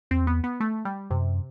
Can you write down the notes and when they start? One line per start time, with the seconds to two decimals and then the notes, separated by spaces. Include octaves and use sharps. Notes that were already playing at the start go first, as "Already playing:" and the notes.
0.11 E2 C4
0.27 B3
0.44 B3
0.60 A3
0.85 G3
1.10 F#2 C3